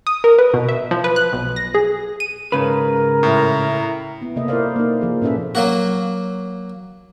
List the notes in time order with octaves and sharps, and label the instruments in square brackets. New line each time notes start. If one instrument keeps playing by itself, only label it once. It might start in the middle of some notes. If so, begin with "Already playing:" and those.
[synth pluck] D#6
A#4
B4
B2
E5
F3
B4
F#6
B1
A#6
G#4
D#7
[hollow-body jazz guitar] G#2 C#3 B4 [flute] A#4
[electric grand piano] A2 [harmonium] E4 A#5
[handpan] B3 E4
C3 A#3 A4 D#5 E5
E4 F4 A#4 C5 D5 F5
A#3 D#4
F3 G#4
A#2 C#4 A4 B4 E5
[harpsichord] F#3 A#3 F#4